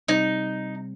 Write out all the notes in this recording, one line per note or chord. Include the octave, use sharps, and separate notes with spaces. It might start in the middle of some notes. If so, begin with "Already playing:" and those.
C3 G3 C4 D#4